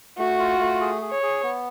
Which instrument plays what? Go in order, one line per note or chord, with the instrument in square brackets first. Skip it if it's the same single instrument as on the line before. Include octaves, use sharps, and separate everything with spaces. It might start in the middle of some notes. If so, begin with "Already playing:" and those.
[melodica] A3 [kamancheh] F#4
[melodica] F4
A3
G#4
G#4
[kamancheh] C#5
[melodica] G#4
B3